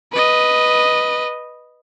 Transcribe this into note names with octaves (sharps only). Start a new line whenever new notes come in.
B4 D#5